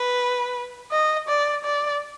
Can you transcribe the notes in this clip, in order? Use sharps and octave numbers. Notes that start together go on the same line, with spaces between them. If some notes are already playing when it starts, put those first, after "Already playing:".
Already playing: B4
D#5
D5
D5